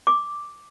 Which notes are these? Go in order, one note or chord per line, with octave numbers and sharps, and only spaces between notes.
D6